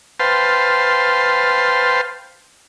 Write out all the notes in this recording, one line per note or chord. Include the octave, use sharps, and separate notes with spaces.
B4 C5 F5 G5 A5 C6